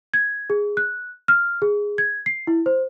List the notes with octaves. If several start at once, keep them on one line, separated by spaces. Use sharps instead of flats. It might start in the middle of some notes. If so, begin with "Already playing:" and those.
G#6
G#4
F#6
F6
G#4
G#6
C7
E4
C5